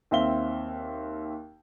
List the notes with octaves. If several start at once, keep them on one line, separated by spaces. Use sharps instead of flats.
D#2 C4 E5 F5 G7